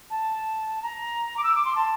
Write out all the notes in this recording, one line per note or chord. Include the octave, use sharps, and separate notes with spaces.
A5
A#5
D6
E6
D6
C6
A5